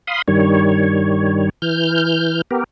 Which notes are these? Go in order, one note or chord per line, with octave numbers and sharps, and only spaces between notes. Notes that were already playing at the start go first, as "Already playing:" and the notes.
F5 B5 C6 D#6
G2 D#3 G3 C#5
E3 F6 G6
B3 G4 A#4